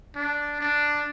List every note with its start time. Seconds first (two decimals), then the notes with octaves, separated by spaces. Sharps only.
0.16 D4
0.61 D4